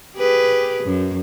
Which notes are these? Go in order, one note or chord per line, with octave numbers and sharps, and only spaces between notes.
G4 G#4 B4
F#2